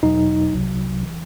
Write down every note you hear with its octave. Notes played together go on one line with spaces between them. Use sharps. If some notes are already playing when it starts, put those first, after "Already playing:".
E2 B2 F#3 D#4
C2 C3 F#3
E3